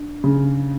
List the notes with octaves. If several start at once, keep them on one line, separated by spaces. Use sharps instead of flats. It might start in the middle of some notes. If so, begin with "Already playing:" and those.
Already playing: D4
C#3